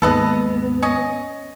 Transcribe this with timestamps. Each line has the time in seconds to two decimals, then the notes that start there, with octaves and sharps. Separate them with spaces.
0.02 D#2 G#2 B3 A4 B4 D#5
0.82 C#4 D#5